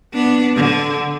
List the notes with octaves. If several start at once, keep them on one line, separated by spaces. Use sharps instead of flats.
B3 D4
D3